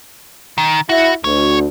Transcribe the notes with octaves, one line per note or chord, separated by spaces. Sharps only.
D#3
E4 F#4
D2 C#5